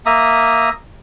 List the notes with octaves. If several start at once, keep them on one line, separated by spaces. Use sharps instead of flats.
A#3 E5 A#5 D#6